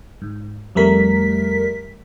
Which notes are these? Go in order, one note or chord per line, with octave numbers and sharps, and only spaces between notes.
G#2
F2 G3 A3 A#4 B6